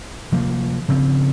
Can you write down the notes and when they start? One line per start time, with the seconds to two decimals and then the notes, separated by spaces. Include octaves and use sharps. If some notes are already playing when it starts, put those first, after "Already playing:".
0.32 C3 F3 A#3
0.88 C#3 F3 C4